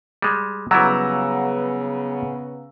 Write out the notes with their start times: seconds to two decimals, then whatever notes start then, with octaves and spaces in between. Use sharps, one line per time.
0.22 G3 G#3
0.71 C#3 F#3 G3 B3 E4 F#5 A#5 E6